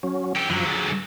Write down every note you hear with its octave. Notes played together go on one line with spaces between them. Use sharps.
F#3 C#4
G4 A4
F#2 D3 F3 F#3
G#4 A6